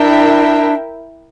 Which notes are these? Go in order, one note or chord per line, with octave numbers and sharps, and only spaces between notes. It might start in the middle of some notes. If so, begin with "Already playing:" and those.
Already playing: D4 E4 A#4 E5 G5